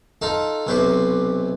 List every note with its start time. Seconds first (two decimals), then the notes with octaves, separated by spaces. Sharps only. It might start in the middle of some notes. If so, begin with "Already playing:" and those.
0.22 D#4 F4 A4
0.67 B1 C3 B4 C5